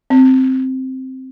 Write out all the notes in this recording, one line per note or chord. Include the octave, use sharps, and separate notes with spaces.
C4